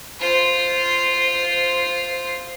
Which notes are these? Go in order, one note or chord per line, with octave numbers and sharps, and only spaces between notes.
F4 C5